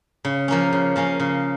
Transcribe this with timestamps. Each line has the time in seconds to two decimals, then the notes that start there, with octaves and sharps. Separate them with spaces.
0.25 C#3
0.48 F3 A#3 C#4
0.73 C#3
0.96 F3 A#3 C#4
1.20 C#3